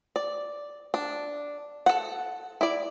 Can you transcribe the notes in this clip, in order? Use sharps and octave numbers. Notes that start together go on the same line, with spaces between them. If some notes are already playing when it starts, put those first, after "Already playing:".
D5
D4
A4 F#5
E4 D5